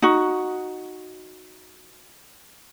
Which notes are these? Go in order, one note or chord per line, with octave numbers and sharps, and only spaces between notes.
D#4 F#4